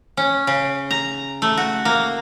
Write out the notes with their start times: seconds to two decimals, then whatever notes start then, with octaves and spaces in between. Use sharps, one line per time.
0.17 C#4
0.47 C#3
0.91 A#5
1.42 A3
1.57 F#4
1.85 A#3